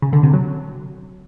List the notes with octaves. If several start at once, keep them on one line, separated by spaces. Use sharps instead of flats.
C#3
D3
C3
F#3